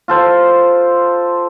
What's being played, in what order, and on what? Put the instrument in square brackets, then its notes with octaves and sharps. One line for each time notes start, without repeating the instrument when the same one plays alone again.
[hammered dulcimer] F4 A4 C5